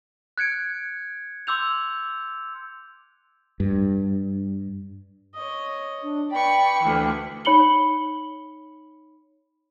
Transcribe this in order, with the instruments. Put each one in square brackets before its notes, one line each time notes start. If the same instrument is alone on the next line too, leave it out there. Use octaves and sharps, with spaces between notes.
[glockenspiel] F#6 G#6 C#7 D7
C6 D6 E6 G6 F7
[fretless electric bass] G2
[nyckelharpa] C#5 D#5
[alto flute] D4
[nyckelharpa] B4 B5 [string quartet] D5 C#6 [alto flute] G5
[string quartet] D2 E3
[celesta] D#4 C#5 B5 C#7 F#7 G7